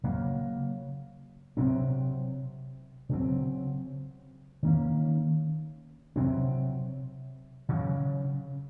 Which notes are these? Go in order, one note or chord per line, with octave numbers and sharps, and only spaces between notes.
C#3 F#3 A#3
C3 F#3 C4
C#3 F#3 C4
D#3 A#3 C#4
C3 F#3 C4
C#3 F#3 C#4